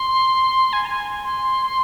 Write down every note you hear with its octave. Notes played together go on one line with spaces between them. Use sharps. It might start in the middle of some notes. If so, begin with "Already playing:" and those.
Already playing: C6
G#5
A#5
G#5
C6